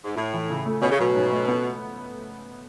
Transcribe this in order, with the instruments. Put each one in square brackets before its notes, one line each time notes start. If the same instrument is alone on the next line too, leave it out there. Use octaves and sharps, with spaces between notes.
[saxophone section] G#2
[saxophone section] A2 [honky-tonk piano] E4
[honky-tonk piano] E3
C#3
A3
[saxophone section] B2 [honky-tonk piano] C#4
[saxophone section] C#3
[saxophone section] B2 [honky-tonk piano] F#3
[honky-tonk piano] G#2
A3
B3